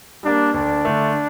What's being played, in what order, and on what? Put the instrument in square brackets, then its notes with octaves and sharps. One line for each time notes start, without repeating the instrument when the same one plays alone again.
[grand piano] G3 A#3 [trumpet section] D4
[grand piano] D2 [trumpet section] D4
[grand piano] D3 A3